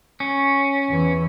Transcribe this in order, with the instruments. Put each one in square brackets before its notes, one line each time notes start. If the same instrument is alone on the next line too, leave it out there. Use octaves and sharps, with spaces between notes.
[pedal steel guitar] C#4
[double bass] E2 E3